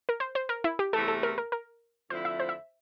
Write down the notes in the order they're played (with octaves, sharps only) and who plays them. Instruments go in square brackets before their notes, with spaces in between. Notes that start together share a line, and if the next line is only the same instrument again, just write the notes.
[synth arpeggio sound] A#4
C5
C5
A#4
E4
G4
[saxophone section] E2 C3 E3 A3 [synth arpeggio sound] A4
[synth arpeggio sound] A4
A#4
A#4
A#4
[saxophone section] F2 D3 F3 A3 E4 [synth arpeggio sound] C5
[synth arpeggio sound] E5
C5
E5